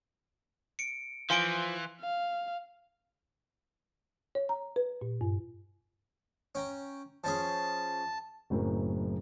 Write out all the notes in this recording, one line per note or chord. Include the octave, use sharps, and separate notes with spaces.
C#7 D7
E3 F3 F5 G#5 C6 D7
F5
C#5
A#5
B4
A#2
G2
C#4 G5 A#5
F3 C#4 G#4 A5
F#1 F#2 A2 C4 A#4